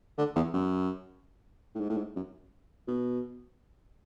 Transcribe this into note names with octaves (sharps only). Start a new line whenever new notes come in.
D3
E2
F#2
A2
G#2
A2
G#2
F#2
B2